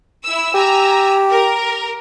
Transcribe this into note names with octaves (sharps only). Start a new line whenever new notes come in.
E4 E6
G4 G#5 A#5 E6
A#4